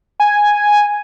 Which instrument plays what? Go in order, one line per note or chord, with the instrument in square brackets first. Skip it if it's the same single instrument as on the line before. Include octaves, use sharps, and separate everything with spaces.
[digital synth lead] G#5